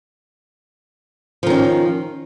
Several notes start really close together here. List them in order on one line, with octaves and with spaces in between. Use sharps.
F3 D#3 C#4